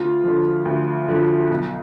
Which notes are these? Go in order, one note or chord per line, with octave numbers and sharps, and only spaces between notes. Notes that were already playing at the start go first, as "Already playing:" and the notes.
Already playing: D2 F4
D3 F3
D2
D3 F3
B1